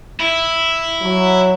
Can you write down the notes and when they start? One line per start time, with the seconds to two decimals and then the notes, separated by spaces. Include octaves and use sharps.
0.20 E4
1.02 F#3